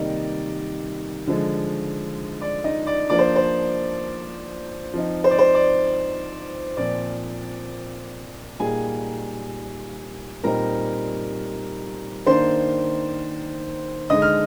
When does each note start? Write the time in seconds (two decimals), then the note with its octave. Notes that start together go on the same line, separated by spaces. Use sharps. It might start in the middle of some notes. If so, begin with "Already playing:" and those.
Already playing: C3 D#3 G3 A#3 D#4 D5 D#5
1.27 D3 F3 G#3
2.41 D5
2.64 D#4 D#5
2.87 D5
3.10 F3 A#3 D4 D5
3.18 C5
3.36 C5
4.94 F3 C4 D#4
5.24 C5
5.31 D5
5.39 C5
5.55 D5
6.77 A#2 F3 C4 D5
8.60 A#2 G3 A#3 D#4 G#4 G#5
10.44 A#2 G3 C4 D#4 A#4 A#5
12.26 D#3 A#3 D4 C5 C6
14.10 D3 G#3 D#4 D#5 D#6
14.22 F6